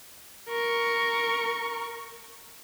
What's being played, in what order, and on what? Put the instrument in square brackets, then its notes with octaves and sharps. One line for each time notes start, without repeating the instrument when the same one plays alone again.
[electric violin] A#4 C#6